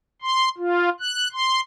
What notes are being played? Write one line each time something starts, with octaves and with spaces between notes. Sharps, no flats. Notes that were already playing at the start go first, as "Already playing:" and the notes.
C6
F4
F#6
C6